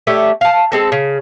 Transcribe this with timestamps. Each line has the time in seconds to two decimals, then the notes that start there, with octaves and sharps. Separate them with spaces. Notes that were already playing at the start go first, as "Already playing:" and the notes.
0.07 A3 D4 G4 C#5
0.41 F5 A5
0.72 G#3 C4 A4
0.92 C#3